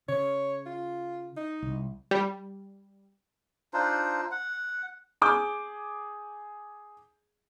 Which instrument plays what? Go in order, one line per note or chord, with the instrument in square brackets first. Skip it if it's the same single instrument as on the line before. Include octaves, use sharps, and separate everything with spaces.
[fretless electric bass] C#3 [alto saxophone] C#5
[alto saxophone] F4
D#4
[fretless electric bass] C2
[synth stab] G3
[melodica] D4 D#4 F4 C5
F#5
[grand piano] G#4 D6 G6